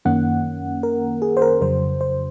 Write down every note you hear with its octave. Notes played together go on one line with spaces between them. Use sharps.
F#2 D#3 A#3 C#4 F#5
A#4
G#4
C5
A#4
F2 C#3 F#3 C5
C5